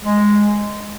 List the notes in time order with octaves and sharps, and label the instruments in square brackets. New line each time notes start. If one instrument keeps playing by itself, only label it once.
[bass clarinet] G#3